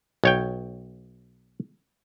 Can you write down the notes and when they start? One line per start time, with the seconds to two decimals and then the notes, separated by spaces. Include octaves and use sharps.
0.24 B1 C#5 G5